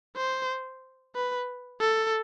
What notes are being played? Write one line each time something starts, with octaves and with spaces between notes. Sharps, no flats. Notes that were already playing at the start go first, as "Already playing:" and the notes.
C5
B4
A4